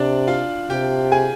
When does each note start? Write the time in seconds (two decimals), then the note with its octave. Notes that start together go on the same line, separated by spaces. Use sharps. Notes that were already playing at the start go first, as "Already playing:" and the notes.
Already playing: C3 D4 D5
0.28 F4 F5
0.70 C3 G4 G5
1.12 G#4 G#5